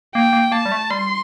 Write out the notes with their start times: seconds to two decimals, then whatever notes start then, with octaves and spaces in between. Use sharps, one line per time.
0.15 A#3 G5
0.33 A#3
0.52 A#3 A5
0.65 G3
0.72 A3
0.90 G3 C6